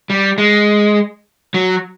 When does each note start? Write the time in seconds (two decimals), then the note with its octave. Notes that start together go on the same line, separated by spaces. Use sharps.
0.10 G3
0.38 G#3
1.54 F#3